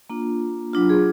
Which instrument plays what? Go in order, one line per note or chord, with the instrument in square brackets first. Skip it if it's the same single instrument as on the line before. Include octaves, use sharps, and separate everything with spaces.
[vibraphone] A#3 D4 F4
F#3 D4 F4
G#4